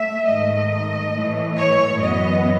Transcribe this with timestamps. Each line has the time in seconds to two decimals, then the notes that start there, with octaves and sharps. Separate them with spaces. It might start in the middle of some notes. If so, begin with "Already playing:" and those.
Already playing: A3 E5
0.27 G#2 D#3 A3 D#5
1.14 A2 E3 A3
1.58 C#5
2.01 F#2 E3 B3 D#5